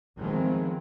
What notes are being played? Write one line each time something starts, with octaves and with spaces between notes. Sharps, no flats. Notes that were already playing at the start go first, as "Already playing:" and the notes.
D#3 F3 G#3 A3 B3 C4